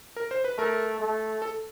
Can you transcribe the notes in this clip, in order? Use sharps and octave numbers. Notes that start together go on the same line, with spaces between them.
A#4
C5
B4
A3 A#4
A3
A4